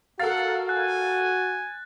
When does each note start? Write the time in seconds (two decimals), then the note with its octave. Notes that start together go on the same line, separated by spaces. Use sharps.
0.20 F#4 A4 A#4 F5 F#5 A6
0.69 G#5 F#6